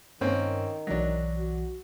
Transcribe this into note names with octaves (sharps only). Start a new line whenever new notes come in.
G2 D#3 A#3 C4 C#4
B1 E3 F#3 D4 A#6
F#4